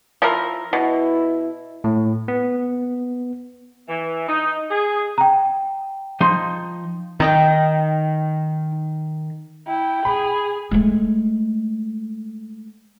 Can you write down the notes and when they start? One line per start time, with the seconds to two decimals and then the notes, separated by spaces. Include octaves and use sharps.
0.22 F3 E4 A#4
0.73 B2 E4
1.84 A2
2.28 B3
3.88 E3
4.28 D#4
4.71 G#4
5.18 G5 A#5
6.21 F3 D#4 C6
7.20 D#3 D#4 D#5 G5
9.67 E4 G5
10.05 G#4 B5
10.71 G#3 A3